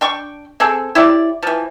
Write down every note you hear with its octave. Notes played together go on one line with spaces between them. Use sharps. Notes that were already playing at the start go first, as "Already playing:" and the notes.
D4 G5 C#6
C4 G#4 A4
E4 G4 C#5 D5
E3 F3